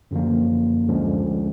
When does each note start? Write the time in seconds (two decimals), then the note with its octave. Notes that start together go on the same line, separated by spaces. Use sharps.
0.11 F#2 D3 F3 A#3
0.88 D2 D3 F3 G#3 C#4